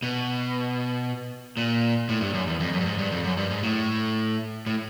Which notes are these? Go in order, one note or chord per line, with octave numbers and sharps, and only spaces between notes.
B2
A#2
A2
G2
F#2
E2
F2
F#2
G2
G#2
G2
F2
F#2
G2
G#2
A2
A2